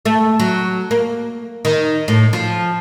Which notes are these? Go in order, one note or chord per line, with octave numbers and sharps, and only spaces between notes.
A3
F#3
A#3
D#3
A2
F3